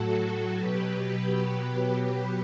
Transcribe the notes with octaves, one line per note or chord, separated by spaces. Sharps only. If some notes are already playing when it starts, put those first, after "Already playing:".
Already playing: A2 F#3 F#4 A4
B2 F#3 G4 B4